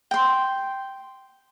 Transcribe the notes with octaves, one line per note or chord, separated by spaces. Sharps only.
G5 C6